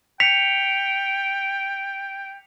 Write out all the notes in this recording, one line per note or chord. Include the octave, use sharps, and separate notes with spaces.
G5 B6 C#7 F7